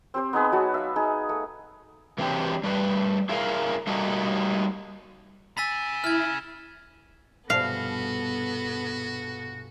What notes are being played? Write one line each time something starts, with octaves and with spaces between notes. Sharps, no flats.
C4 G4 C5
B3 D#4 G#4 B4
F#3 F#4 A5
E5 F5
D#4 G#4
A3
E3 F#3 C4 D4 G4
G3 A3 B4
E4 G#4 A#4 F5
G3 A3 A#3 D#4 F#4 A4
C#3 G#5 E6 A6 B6
E4 F6 G#6
A#1 G2 B2 B3 F#4 A4 F5